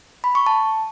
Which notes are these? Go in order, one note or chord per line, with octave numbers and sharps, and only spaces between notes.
B5
C#6
A5